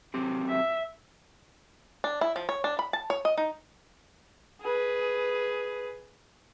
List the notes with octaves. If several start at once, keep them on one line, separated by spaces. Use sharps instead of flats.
F#3 C4 G4
E5
D4
E4
F3
C#5
D4
B5
A5
C#5
D#5
D#4
G#4 B4